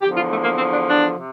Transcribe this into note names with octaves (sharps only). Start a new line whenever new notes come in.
E2 D3 F3 G4
F4
A3
A#3
C4
D4
D4
C3